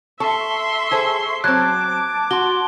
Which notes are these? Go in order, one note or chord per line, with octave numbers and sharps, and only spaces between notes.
A4 E5 A5 C6 C#6
G#4 A4 C5
F#3 C4 A5 D6 F#6 G#6
F#4 C6 G7